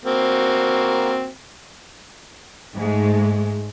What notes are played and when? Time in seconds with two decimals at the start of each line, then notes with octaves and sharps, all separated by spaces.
0.05 A#3 C4 F#4
2.75 G#2 G#3 A3